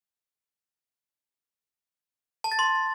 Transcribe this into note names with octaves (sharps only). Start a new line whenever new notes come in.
A5
A6
C6